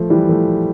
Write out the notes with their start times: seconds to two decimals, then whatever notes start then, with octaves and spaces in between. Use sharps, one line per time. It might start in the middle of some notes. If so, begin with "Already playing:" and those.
Already playing: F3 A3
0.10 E3 G3
0.29 F3 A3